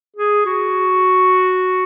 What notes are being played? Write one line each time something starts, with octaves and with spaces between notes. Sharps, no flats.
G#4
F#4